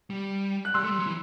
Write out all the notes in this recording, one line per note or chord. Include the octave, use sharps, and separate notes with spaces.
G3
F#6
G3 C6 E6
A3
G3
F#3
E3